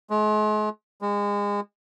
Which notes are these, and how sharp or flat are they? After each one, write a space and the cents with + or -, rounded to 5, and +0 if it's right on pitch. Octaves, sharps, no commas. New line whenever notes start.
G#3 +40
G#3 -30